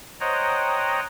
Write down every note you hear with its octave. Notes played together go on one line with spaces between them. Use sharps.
C5 C#5 D#5 F#5 G5 A#5